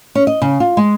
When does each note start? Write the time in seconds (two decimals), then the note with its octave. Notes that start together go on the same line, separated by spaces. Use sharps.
0.15 C#4
0.27 D#5
0.42 C#3
0.60 F4
0.77 G#3